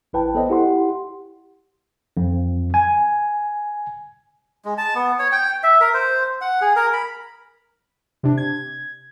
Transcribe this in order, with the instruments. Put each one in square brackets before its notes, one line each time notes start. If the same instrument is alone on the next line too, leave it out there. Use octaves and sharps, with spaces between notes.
[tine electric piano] A1 E4 B4 G5 A5
B3 A4 C5 D5 D#5
E4 G4 F#5 C6
F2
G#5
[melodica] G#3
A5
B3
C#5
G5
E5
A#4
C5
F#5
G#4
A#4
B5
[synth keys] C3 D4
G#6